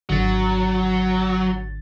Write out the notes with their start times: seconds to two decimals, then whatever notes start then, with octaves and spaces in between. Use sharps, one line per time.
0.09 G#1 D3 F#3 A6